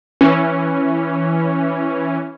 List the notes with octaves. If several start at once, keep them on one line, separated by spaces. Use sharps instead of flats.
E3 C#4